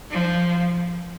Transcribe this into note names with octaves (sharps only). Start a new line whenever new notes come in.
F3